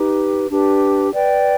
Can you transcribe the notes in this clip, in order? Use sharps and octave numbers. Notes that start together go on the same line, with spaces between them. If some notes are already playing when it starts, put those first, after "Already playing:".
Already playing: D#4 G4 B4
D4 G4 B4
B4 D5 G5